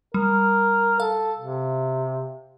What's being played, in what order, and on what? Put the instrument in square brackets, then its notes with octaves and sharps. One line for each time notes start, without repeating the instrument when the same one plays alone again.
[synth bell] G3 [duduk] A#4
[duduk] A4 [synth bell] F5
[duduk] C3